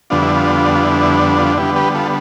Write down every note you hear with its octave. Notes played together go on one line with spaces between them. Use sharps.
F2 D3 G3 B3 D4 F4
E4
F4
F4
E4
E4
F4
D3 G3 B3 E4 G4
G4 B4
F4 A4